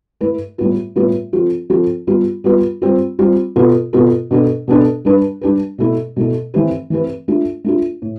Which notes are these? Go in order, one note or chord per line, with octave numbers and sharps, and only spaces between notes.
A3 E4 B4
A2 G3 B3 F4 B4
A2 G3 B3 F4 B4
F3 C4 F4 A4
F3 C4 F4 A4
G3 B3 F4 B4
G3 B3 F4 B4
G3 C4 F4
G3 C4 F4
B2 B3 F4 A4
B2 B3 F4 A4
B2 B3 D4 A4
B2 B3 D4 A4
G3 D4 G4 B4
G3 D4 G4 B4
B2 A3 E4 A4
B2 A3 E4 A4
E3 A3 C4 G4 B4
E3 A3 C4 G4 B4
A3 D4 F4
A3 D4 F4
A2